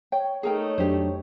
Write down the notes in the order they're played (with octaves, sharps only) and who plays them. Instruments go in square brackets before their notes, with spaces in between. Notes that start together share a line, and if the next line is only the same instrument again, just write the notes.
[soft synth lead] C#5 [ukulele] G5
[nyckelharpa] A3 D#4 [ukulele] G#4 A#4 G5
[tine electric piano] F2 F#3 D4 [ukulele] G4 C5